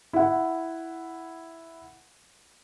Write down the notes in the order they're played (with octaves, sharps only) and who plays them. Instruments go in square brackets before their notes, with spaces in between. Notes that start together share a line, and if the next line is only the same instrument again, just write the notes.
[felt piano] E4 F#5